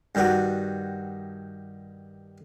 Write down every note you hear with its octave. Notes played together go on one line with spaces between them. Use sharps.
G2 D#3 D4 F#4